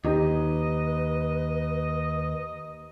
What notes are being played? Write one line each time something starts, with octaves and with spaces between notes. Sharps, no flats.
D#2 D#4 G4 B4 D#5